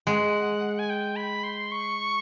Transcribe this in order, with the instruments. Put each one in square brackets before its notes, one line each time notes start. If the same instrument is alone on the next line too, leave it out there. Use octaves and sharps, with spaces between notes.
[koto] G#3 [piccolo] F#5
[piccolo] G#5
G5
B5
C6
C#6